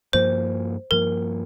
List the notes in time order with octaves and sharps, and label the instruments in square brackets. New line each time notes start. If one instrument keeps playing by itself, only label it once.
[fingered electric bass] G2 F3 A#3 [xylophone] C5
[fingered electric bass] G2 F3 A#3 [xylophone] A#4